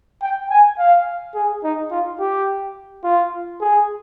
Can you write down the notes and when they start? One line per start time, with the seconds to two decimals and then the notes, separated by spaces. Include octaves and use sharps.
0.22 G5
0.50 G#5
0.78 F5
1.35 G#4
1.64 D#4
1.91 F4
2.20 G4
3.04 F4
3.61 G#4